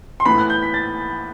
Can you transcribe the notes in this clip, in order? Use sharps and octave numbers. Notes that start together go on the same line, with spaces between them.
C6
A2 E3 B3 B5
F#6
G6
B6
A6